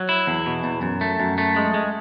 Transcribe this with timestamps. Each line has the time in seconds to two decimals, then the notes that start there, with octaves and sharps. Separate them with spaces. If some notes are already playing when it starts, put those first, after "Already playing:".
Already playing: F#3
0.09 E4
0.27 E2
0.46 B2
0.64 E2
0.82 F#2
1.01 A3
1.20 F#2
1.38 A3
1.56 G#3
1.74 G#3